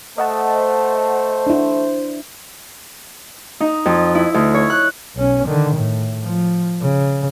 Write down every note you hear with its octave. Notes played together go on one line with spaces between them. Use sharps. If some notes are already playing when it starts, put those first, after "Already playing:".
A3 C5 D#5 F#5 A5
D4 E4
D#4
F2
E4
D2
C#5
F#6
B1 C#4
D3 D#3
A2
F3
C#3